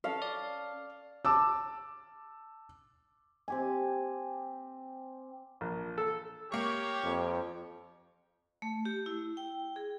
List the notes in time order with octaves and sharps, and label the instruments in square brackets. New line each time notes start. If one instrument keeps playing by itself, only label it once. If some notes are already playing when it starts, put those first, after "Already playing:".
[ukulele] C#4 A4 [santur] F5
[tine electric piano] D5
[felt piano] A5 D6 E6
[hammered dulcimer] C4 G4 G#5
[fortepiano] A#1
A4
[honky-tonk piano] A#3 C#6 [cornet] G4 [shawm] C#5
[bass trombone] F2
[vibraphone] A3
G4
E4
G5
G#4